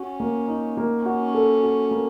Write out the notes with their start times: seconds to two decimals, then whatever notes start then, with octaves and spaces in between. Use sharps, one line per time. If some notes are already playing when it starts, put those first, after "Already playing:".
Already playing: C#4 F#4
0.20 A#3
0.48 D#4
0.77 A#3
1.06 C#4 F#4
1.35 A4
1.63 F#4
1.91 A#3